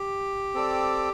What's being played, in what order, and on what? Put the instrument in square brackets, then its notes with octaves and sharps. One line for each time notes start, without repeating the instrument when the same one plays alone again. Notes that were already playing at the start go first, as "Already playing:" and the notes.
Already playing: [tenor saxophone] G4
[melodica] C4 A4 D5